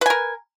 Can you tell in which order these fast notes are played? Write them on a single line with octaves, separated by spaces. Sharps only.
B4 G#5 A#4